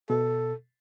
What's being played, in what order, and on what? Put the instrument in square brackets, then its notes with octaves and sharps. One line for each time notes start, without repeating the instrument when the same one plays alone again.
[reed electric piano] B2 [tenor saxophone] A4